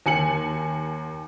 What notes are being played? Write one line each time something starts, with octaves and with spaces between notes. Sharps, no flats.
D#2 G#5 C#7 F#7